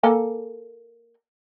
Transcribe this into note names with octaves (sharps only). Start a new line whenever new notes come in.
A#3 A4 G#5